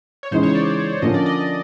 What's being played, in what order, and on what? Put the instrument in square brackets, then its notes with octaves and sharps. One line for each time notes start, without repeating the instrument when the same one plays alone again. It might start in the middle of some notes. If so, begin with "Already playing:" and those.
[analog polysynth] C#5
[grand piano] C#3 E3 G#3 B3 D#4 [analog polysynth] C5
[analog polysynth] C#5
D5
D5
[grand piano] D3 F3 A#3 C#4 [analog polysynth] D#5
[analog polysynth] D5
D#5